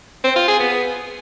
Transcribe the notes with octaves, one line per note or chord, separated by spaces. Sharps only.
C4
F4
G#4
B3